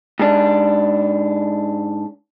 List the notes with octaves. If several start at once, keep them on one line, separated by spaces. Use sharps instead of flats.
G#2 D4